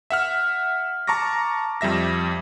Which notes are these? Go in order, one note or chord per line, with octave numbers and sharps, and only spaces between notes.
E5 F#5 F6
A5 A#5 C#6 D6 A#6
F2 G3 E5 A#6